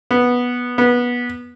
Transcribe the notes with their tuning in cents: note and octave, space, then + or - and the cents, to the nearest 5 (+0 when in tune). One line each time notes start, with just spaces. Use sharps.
B3 -10
B3 -20